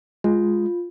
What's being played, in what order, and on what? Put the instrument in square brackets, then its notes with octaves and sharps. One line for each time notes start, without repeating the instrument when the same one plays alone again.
[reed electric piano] G#3 [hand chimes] F4